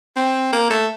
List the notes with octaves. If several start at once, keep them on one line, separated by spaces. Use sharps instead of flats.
C4
A#3
A3